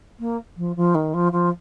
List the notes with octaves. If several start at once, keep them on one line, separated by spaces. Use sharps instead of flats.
A#3
F3
F3
D#3
F3
F3